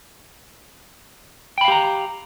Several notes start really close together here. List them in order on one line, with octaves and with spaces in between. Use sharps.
G5 B5 F5 G4 A#5